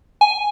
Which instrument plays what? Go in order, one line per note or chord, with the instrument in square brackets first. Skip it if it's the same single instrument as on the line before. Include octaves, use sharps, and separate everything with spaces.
[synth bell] G#5